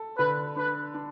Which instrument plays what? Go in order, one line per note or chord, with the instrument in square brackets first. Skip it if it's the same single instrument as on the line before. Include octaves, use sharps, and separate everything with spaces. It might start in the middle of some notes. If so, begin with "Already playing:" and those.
Already playing: [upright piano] A4
[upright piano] D3 [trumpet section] B4
[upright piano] D4 [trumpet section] B4
[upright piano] D4